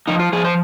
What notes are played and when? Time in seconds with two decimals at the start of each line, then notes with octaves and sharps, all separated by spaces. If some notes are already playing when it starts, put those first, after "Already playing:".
0.07 F3 D#4
0.20 F4
0.33 F3 G#4
0.44 C5